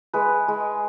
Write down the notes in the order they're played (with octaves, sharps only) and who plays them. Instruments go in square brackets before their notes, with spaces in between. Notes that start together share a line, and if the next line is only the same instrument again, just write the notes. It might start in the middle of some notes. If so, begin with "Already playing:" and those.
[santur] G#3 B4
G#3